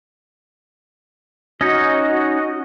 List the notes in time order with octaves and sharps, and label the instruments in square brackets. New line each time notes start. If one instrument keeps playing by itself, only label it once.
[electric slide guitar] C#4 D#4 [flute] F#4 [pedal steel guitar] D#5